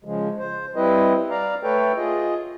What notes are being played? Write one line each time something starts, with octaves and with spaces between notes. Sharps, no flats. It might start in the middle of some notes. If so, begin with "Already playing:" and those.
C#3 F3 G#3
C5
G3 C4 E4 B4 D#5
D5 F5 A#5
A3 A4 B4 C#5 G5
F4 G#4 D#5